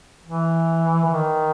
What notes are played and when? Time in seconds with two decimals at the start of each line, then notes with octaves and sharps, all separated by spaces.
0.25 E3
1.05 E3
1.13 D#3